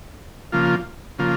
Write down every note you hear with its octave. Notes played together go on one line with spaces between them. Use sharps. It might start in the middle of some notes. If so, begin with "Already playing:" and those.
C#3 F3 A#3 F4
C#3 F3 A#3 F4